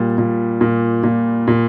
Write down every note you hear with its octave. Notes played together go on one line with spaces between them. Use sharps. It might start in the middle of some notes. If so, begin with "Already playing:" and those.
Already playing: A#2 G3
A#2
A#2
A#2
A#2